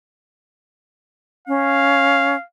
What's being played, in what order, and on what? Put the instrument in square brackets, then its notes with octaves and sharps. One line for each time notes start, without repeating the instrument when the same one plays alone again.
[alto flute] C#4 [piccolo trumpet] F5